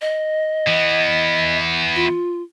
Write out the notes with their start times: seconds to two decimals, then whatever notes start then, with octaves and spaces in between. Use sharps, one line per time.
0.01 D#5
0.67 E3 B3
1.95 F4